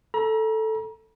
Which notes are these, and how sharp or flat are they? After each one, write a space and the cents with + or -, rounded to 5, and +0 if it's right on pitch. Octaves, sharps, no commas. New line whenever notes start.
A4 +0 A#5 +35